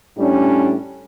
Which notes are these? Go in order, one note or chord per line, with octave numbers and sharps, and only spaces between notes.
A2 G3 C#4 D4